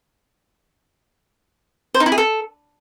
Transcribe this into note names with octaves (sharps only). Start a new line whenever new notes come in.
C5
D#4
E4
G#4
A4